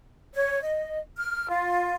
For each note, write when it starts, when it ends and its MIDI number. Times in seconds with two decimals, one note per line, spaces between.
0.34 0.61 73
0.63 0.99 75
1.18 1.47 89
1.48 1.94 65